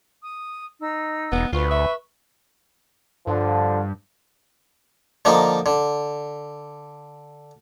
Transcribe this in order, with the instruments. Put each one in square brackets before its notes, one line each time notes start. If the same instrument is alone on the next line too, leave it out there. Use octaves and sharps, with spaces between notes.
[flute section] D#6
D#4 E6
[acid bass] E1 [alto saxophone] B3
[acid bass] D2 [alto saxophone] F4 [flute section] B4 C#6
[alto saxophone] E5
[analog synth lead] G2 [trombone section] D3 F3
[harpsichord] D3 F3 A#3 D#4
D3